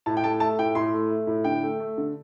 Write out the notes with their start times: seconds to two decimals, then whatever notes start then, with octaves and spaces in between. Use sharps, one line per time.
0.06 A2 A5
0.17 G5
0.24 A3 A5
0.40 A3 A5
0.59 A2 G5
0.75 A2 C6
0.94 A3
1.10 A3
1.27 A2
1.44 D3 G5
1.63 A3
1.80 A3
1.98 D3